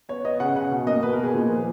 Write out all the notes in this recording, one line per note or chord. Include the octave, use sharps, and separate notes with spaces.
B3 C#5
B3 D#5
C#3 F#5
C#3 F#5
B2
A#3 D#5
B2 B4
A#4
B2
G#4
A#2
F3